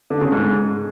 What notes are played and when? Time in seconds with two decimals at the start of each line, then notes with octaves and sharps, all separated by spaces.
0.10 D3
0.21 C#3
0.32 G#2